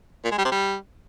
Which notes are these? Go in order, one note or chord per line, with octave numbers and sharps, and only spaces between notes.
A#2
G#3
G3
C3
G3